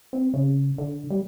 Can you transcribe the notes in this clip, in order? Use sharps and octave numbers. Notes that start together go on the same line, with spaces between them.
C4
C#3
D3
G3